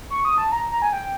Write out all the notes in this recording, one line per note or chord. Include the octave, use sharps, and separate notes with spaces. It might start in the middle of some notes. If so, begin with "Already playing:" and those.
C#6
D#6
A5
A#5
A#5
G#5
G5